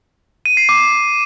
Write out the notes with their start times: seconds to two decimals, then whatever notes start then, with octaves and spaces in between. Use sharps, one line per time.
0.46 D#7
0.57 C7
0.69 D6